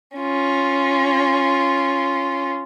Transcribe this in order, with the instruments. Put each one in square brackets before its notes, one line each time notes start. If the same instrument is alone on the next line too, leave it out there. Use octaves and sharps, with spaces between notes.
[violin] C#4 F4